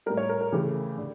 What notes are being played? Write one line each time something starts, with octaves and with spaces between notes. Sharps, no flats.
A2 G3 A#4
C#5
A#4
A#4
C#3 E3 A3 G4
D3